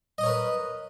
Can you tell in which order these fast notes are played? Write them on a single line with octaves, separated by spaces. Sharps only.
D#5 D#6 C#5 A#4 B4